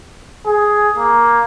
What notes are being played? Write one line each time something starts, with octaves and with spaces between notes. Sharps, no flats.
G#4
A#3